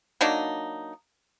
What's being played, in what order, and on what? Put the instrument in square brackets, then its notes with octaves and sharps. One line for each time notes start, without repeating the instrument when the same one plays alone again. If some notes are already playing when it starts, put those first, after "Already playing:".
[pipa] F#3 A#3 D4 D#4